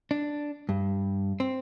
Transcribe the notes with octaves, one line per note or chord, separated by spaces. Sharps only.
D4
G2
C4